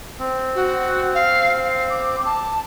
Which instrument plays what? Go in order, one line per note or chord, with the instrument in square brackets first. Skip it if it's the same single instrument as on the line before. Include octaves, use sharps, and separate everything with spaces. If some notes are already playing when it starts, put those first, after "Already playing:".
[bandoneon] C4
[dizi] F#4
F5
F5
D6
A5